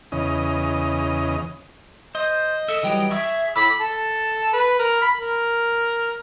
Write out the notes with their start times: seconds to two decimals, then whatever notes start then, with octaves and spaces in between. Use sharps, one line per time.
0.12 E2 C#3 D#5
2.15 C5 D#5
2.68 A4 E5
2.83 E3 F#3 G3 G5
3.11 G#4 E5 C#6 E6
3.56 A2 B5 D6 E6
3.80 A4
4.53 B4
4.79 A#4
5.02 B5
5.19 A#4